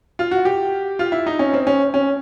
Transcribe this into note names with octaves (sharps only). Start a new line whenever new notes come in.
F4
F#4
G4
F4
E4
D#4
C#4
C4
C#4
C#4